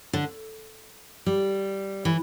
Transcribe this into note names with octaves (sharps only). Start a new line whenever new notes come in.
D3
G3
E3